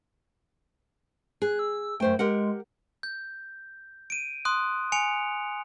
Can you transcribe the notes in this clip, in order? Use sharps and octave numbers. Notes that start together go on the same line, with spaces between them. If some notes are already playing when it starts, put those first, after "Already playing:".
G#4 F#6
E6
F#2 A3 C5 G5
G#3 G4 A#4 F#5
G6
D7 D#7
C6 D#6 F#6
G#5 C#7 D7 F7